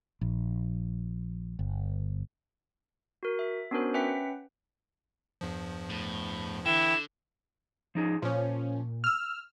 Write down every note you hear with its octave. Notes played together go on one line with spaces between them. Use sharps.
A#1
G1
F#4 A#4
E5
B3 C#4 D4 F#4 A#4 C5
C#4 B4 E5 F#5 G5 B6
E2 G2 F3
A2
D3 E3 E4 G5 E7
F3 D#4 G#4
A#2 F3 C#4
E6 F6